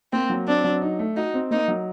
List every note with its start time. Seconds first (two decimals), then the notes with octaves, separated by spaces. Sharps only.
0.12 A#3 C4
0.30 F#3
0.48 C4 D4
0.64 F#3
0.82 D#4
0.99 A3
1.16 D#4 F#4
1.34 C4
1.51 A#3 D#4
1.68 F#3